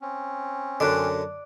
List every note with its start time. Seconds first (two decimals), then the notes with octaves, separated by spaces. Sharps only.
0.02 C4 C#4
0.80 F#2 D3 D5 F#6